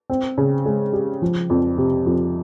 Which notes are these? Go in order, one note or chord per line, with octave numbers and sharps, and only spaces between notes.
C4
C#3
G#3
G4
F3
F2
C3
F2